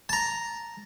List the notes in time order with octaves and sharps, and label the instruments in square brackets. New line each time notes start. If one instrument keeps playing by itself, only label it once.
[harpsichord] A5 A#5